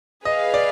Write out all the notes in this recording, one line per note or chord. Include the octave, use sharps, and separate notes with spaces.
G#4 B4 D#5 F5
D5